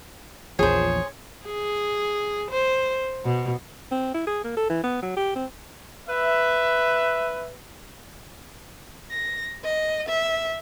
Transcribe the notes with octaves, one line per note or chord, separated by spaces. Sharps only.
A#1 E2 F3 G#4 C5 C#5
G#4
C5
B2
C4
E4
G#4
A#3
A4
E3
B3
F#3
G4
C4
B4 E5
A#6
D#5
E5